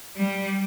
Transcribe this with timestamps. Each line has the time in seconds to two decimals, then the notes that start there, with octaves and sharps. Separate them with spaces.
0.17 G3